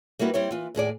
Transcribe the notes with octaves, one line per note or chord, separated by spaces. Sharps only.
G3 A#3 E4 F#4 B4
G3 C4 E4 G4 C#5
E3 F4
D#2 A2 G#4 D5